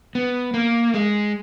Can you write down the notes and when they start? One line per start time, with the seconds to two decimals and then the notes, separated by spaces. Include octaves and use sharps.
0.15 B3
0.54 A#3
0.94 G#3